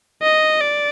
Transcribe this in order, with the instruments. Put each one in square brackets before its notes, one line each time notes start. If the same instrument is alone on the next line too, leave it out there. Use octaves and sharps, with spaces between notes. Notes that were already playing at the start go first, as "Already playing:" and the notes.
[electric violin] D#5
D5